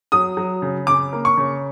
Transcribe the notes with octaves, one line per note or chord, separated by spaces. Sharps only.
F#3 D#6
F#3
C#3
C#3 D6
A#3
C#6
C#3